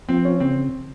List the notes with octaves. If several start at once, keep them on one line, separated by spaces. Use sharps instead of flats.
F3 C4
C#4
C#3 C4